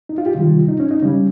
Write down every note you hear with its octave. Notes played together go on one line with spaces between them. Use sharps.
D#4
F4
G4
C3 D#3 G3 F4
D#4
C#4
D#4
C#3 G3 C#4